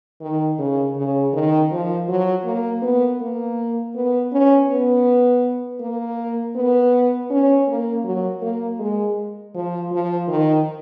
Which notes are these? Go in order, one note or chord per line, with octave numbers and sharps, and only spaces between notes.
D#3
C#3
C#3
D#3
F3
F#3
A#3
B3
A#3
B3
C#4
B3
A#3
B3
C#4
A#3
F#3
A#3
G#3
F3
F3
D#3